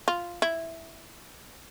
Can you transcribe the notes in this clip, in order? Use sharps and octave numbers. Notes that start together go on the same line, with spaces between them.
F4
E4